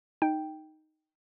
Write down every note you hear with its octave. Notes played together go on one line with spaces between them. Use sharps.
D#4 G5